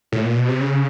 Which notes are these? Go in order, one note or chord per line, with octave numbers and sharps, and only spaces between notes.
A2
A#2
B2
C3
C#3